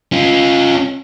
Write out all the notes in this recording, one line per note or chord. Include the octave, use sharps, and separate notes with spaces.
C#4 F4